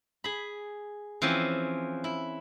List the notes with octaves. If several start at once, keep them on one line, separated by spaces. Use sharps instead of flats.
G#4 B5
E3 F3 C4 C#4
E4